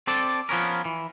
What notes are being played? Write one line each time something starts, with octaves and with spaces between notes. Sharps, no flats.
C4 A4 D5 A5
F3 B3 C#4 A#4
E3